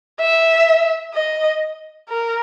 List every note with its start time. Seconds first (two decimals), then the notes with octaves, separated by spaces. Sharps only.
0.20 E5
1.14 D#5
2.09 A#4